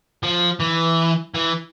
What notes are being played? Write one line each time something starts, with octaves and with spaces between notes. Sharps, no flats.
F3
E3
E3